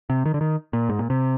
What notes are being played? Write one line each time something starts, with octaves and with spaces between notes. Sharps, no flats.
C3
D#3
D3
D#3
A#2
G#2
A#2
C3